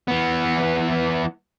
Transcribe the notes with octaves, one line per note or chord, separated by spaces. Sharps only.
E3 B3